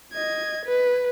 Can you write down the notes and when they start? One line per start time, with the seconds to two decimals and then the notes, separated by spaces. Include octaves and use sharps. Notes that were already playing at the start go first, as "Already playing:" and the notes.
0.13 D#5 G#6
0.66 B4